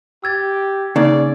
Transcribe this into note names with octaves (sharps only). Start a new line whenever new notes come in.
G4 E6 G#6 A6
C#3 A#3 D#4 D5